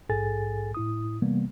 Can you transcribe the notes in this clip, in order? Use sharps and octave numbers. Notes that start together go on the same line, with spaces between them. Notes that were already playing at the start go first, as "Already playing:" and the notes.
A#1 G#2 G#4 A4 G#5 A6
A2 E4 D#6
C3 E3 G3 A#3 B3